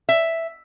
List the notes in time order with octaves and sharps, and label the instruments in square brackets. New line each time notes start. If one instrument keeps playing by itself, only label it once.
[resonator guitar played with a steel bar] E5